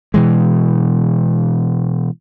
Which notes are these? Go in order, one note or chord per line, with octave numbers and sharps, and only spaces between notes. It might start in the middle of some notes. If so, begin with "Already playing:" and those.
B2 E3 G#3